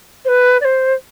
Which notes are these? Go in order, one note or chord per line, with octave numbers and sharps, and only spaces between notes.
C5
B4
D5
C5